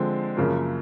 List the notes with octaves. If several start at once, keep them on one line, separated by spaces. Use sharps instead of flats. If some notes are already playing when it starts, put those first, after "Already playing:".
Already playing: D3 F3 G#3 C4
F#2 C#3 F3 A#3